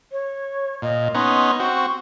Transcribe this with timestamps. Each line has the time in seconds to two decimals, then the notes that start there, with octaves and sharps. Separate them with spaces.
0.12 C#5
0.82 A#2 D#5
1.14 B3 C#4 D#4 C6
1.60 C4 F#4 C#6